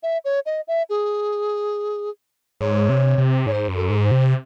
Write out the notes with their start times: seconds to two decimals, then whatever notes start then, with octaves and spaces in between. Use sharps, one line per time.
0.03 E5
0.25 C#5
0.46 D#5
0.68 E5
0.90 G#4
2.61 G#2 C#5
2.89 C3
3.18 C3
3.46 G#2 C#5
3.52 C5
3.68 F#2
3.75 A4
3.90 G#2
4.04 C5
4.11 C3